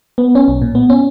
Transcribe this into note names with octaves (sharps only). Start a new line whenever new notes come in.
B3
C#4
B1
A#2
B3
C#4